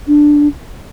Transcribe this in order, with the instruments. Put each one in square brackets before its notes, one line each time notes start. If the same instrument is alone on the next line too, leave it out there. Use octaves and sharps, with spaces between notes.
[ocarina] D4